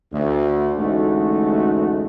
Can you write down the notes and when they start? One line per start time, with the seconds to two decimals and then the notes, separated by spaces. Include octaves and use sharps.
0.13 D2 D3
0.78 A1 D2 G#3 A3 D#4 F#4